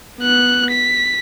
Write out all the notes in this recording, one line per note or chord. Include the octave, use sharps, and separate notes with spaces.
B3 F#6
B6